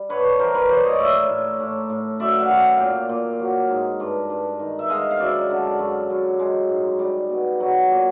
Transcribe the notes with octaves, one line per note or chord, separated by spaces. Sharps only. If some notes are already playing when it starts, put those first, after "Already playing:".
Already playing: G3
G2 B4 C#5
E3 A#4 C5
B4 C#5
E3 C5 D5
C#5 D#5
A2 D5 E5
A2
A2
A2
F#2 D5 E5
F5
E5 F#5
F#2
G5
A#2 F5 G5
A#2
F#3
G#2
G2
G2
D#3
E5
G#3 D#5 F5
F5
F#2 D5 E5
D3
F#2
F#2
G#3
G#2
G3
B2
F#3
A#2